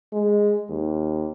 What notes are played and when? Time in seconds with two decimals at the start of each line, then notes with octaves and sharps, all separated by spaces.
0.13 G#3
0.70 D#2